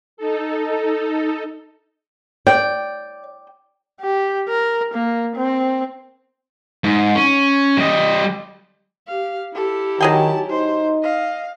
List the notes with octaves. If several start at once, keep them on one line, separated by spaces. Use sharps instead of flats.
D#4 A4
D5 G5
G4
A#4
A#3
C4
G#2
C#4
G3 D#5
G4 F5
E4 G4 A4
D#3 F#3 G#4 G5 A5
D#4 C5
D#5 F5